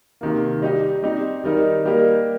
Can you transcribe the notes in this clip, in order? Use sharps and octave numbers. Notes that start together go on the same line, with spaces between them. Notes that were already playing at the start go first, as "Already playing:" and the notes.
C3 D#3 A#3
G3 D#4 G4 D#5
G3 C4 D#4 G4
D#3 G3 D#4 A#4 D#5
G3 A#3 G4 A#4 D#5